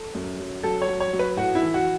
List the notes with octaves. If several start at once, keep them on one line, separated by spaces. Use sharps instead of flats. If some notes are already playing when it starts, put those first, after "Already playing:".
Already playing: A4
F#2
F#3
F#3 A4
C#5
F#3
C#5
F#3
B4
A2 F#4
E4
E3
F#4